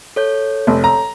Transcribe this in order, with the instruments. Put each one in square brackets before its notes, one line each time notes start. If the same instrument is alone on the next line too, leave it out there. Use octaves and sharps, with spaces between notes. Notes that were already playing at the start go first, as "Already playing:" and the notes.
[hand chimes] A4 C#5 G6
[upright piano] F1
A#5